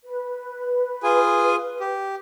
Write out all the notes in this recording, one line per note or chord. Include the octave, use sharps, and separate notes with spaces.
B4
F4 G#4 G#5
G4